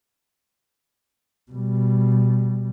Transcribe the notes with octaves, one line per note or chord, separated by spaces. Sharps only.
B2 G3